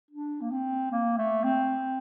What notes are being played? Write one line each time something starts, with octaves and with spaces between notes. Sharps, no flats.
D4
A#3
C4
A#3
A3
C4